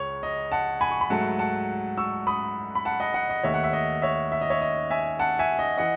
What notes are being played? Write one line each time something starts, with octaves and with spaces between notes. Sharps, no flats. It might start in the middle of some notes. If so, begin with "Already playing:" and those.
Already playing: C#2 C#3 C#5
D#5
F#5 A5
G#5 B5
C#6
B5
G#2 F#3 A3 F#5 A5
F#5 A5
C#6 E6
B5 D#6
B5
F#5 A5
D#5 F#5
D#5 F#5
D#5
D#2 D#3 A3 C#5 E5
F#5
E5
D#5
C#5 E5
E5
D#5
C#5 E5
D#5
E5 G#5
F#5 A5
E5 G#5
D#5
E3 D#5 F#5